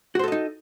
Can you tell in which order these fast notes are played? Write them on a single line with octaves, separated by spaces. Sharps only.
F#4 C5 A4 D#5 D#4